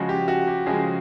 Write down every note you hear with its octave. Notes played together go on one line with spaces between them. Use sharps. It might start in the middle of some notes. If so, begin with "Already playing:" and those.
Already playing: C#3 F3 G#3 F#4
G4
F#4
G4
C#3 F3 G#3 G#4